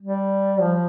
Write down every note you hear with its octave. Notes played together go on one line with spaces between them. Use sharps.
G3
F3